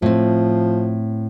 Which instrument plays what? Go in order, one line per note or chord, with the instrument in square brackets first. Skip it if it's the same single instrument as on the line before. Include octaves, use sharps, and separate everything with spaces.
[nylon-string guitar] A2 C4 [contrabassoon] F3